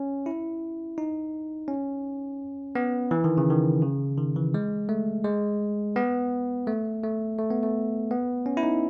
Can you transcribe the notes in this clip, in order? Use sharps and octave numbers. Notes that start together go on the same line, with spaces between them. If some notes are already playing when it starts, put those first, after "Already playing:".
Already playing: C#4
E4
D#4
C#4
B3
E3
D#3
C#3
D#3
C#3
D#3
E3
G#3
A3
G#3
B3
A3
A3
A3
B3
A3
B3
C#4
E4
D#4